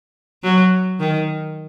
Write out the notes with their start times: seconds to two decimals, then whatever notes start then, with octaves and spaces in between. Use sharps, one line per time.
0.43 F#3
1.00 D#3